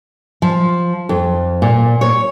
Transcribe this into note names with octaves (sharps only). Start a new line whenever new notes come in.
F3
F2
A#2
C#5